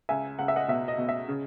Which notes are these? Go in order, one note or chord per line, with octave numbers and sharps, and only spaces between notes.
C#2 E5 G#5
C#2 F#5
E5
D#5 F#5
B2 E5
D#5
B2
E5
C#3